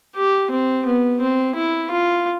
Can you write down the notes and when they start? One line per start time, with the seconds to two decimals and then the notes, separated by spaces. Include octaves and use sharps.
0.16 G4
0.51 C4
0.86 B3
1.21 C4
1.56 E4
1.91 F4